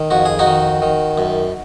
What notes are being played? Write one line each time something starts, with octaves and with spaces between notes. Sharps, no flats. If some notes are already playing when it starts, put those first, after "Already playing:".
Already playing: D#3
F2 F#4
G#4
D#4 F#4
D#3
D#3
F#2